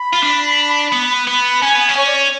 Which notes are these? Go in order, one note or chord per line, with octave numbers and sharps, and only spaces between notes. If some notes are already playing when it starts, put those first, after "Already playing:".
Already playing: B5
F4
D4
B3
B3
C#4 G#5
B3
C#4
C#5
D5
C#5